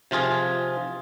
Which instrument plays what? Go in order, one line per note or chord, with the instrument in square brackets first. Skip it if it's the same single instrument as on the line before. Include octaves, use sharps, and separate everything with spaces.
[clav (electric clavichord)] C3 F3 F4 G#4